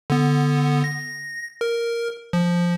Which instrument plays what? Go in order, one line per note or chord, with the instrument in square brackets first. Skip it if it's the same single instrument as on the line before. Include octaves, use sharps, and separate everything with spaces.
[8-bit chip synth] D3 B3
A#6
A#4
F3